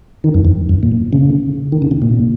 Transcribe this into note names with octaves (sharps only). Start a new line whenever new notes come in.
D#3
F#2
F2
F#2
A#2
C#3
D#3
C#3
C3
A#2